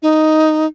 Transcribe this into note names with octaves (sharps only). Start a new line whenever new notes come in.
D#4